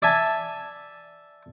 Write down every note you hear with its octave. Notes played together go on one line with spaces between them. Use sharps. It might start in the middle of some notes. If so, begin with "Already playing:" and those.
D5 E5 G#5 A5